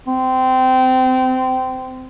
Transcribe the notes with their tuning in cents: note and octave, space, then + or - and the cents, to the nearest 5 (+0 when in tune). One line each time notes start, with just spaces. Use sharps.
C4 -20